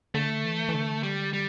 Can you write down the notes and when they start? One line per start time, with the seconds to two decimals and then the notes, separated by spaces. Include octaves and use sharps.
0.14 D3 A3
0.45 E3
0.69 E3
0.75 D3
1.03 G3
1.33 G3